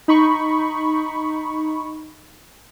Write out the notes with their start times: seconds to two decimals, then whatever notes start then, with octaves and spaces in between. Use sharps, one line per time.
0.08 D#4 B5 C#6